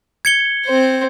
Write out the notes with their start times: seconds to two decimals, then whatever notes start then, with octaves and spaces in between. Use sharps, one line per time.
0.25 G#6 C#7 G7
0.66 C4 C5